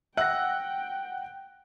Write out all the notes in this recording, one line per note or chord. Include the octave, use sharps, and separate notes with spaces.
F#5 G5 E6 F#6 A#6